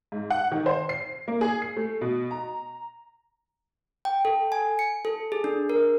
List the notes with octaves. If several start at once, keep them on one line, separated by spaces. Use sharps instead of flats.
G#2
F#5
D#3
C5
C7
A#3
G#4
C7
A3
B2
A#5
G5
A4
G#5
C#7
A4
G#4
D4
A#4